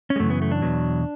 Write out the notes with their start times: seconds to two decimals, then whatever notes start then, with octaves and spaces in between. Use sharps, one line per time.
0.10 C#4
0.16 G#3
0.20 F#2 C#3 E3 A3
0.30 B3
0.42 A3
0.51 D4
0.62 E2 B2 F#3